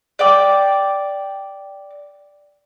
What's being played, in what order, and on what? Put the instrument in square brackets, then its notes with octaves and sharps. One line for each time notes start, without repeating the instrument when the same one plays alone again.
[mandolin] D5 G5 D6